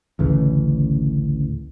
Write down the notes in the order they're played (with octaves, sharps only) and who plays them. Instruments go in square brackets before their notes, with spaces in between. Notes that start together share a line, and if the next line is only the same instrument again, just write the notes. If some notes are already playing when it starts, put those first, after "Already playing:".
[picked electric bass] A1 D2 C#3 E3